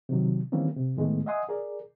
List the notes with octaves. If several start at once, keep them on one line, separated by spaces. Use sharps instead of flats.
C3 D#3 F#3
D#3 E3 G3 A#3 C4 C#4
C3
A2 D#3 G#3 A3 B3
D#5 E5 F#5 G#5 C6 D#6
G#4 A#4 D5